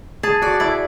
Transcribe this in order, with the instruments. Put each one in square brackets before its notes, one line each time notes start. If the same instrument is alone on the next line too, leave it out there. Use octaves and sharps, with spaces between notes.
[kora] G#4 [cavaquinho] A5
[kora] F#4 [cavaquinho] D5
[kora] E4 [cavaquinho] D5